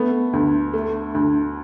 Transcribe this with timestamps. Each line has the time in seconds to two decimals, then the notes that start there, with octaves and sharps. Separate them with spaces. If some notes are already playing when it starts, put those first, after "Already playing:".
Already playing: A3 B3
0.33 D2
0.73 A3
1.14 D2